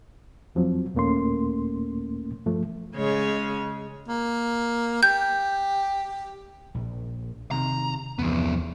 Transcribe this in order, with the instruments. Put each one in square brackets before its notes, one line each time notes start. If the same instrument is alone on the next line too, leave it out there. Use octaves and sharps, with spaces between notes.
[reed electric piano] F2 F3 F#3 C4
D#2 A#2 A3 A#3 C#4 C6
G2 F3 A3
[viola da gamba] C#3 G#3 C#5
[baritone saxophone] A#3
[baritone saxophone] G4 [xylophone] G6
[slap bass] A#1
[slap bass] C3 D#3 [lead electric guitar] A#5
[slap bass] E2 G2 C3 [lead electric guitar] F3 B3